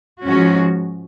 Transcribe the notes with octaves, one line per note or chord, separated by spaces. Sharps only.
G#2 F3 G#3 C#4 F#4